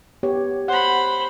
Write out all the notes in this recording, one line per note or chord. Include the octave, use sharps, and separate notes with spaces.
B3 G4 C#5
C5 F#5 B5